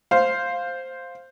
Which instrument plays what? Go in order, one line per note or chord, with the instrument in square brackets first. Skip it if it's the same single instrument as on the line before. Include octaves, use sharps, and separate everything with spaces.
[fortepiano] C5 F5